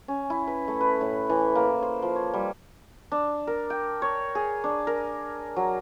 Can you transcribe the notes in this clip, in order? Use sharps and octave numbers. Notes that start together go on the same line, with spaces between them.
C#4
E4
B4
A3
B4
A2
E3
A#3
C5
F3
C#5
G3
D4
A#4
G5
C#5
G#4
D4
A#4
F#3